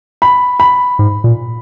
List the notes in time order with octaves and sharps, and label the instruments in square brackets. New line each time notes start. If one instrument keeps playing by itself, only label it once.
[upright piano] B5
B5
[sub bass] G#2
A#2